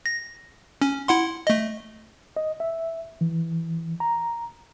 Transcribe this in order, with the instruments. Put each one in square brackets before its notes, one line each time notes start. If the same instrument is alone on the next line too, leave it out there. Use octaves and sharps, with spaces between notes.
[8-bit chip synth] A#6
C#4
E4 F#5 C6
A3 D#5
[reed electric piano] D#5
E5
E3
A#5